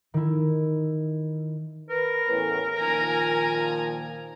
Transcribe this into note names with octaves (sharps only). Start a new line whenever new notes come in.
D#3 E4
A#4 B4
E2 A2 C#4
A#2 D#3 F3 G#5 A#5